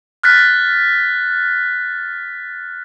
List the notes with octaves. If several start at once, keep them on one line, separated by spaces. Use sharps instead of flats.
F6 F#6 A6 B6